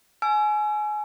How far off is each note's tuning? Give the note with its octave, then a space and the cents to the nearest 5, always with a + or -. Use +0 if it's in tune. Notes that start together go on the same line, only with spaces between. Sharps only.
G#5 +25 E6 +35